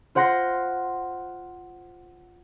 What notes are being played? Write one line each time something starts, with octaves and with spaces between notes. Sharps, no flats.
F4 C5 F#5 C6 A#6